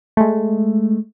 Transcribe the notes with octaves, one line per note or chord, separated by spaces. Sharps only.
G#3 A3